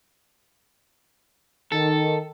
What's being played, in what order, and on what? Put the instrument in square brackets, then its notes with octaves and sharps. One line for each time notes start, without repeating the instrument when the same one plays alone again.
[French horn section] D#3 [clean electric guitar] A4